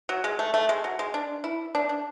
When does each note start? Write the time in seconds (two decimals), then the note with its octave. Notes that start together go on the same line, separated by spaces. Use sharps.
0.09 F#3
0.24 G#3
0.39 A3
0.54 A3
0.69 G#3
0.84 F#3
0.99 G#3
1.14 D4
1.44 E4
1.75 D4
1.89 D4